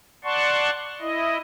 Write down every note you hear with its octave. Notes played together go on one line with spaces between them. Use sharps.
D5 F#5 A5 C6 C#6
E4 D#5